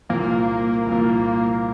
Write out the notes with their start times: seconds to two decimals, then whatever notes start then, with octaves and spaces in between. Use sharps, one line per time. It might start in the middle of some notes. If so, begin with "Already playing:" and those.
0.09 C2 A#2 F3 A#3
0.86 C2 A#2 F3